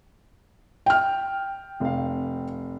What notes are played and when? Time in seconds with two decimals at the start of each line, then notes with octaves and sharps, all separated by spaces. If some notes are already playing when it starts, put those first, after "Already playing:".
0.86 G5 F6
1.80 F1 F5